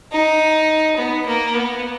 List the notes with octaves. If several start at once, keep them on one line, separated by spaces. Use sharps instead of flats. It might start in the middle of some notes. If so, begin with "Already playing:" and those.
D#4
B3
A#3
B3